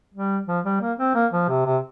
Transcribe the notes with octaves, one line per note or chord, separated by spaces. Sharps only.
G3
F3
G3
A#3
C4
A#3
F3
C3
C3